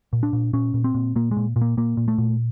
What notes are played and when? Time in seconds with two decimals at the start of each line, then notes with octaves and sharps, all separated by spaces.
0.13 A#2
0.23 D4
0.33 A#2
0.53 A#2 C#4
0.74 A#2
0.84 C4
0.94 A#2
1.16 A#2 A#3
1.31 G#3
1.37 A#2
1.56 A#2
1.61 A#3
1.77 A#2 A#3
1.97 A#2
2.08 A3
2.18 A#2